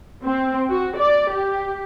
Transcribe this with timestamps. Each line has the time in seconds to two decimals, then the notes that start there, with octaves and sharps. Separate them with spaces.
0.24 C4
0.70 F#4
0.99 D5
1.32 G4